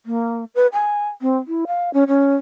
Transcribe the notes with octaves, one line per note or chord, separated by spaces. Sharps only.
A#3
B4
G#5
C4
E4
F5
C#4
C#4